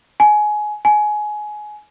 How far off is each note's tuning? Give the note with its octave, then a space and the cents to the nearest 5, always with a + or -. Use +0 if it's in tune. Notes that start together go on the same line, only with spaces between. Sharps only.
G#5 +20
G#5 +20